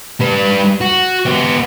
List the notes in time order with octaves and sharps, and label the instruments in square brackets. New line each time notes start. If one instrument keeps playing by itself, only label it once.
[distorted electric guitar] G3 B4
F#4
B3 G4